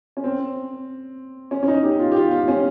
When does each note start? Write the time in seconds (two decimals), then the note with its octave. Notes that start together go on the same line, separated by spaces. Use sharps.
0.17 C#4
0.24 C4
1.51 C#4
1.63 C#4
1.68 D#4
1.83 G4
1.99 F4
2.12 G4
2.16 F4
2.31 F4
2.48 C#4